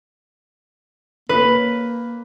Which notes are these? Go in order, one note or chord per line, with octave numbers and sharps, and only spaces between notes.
A#3 B4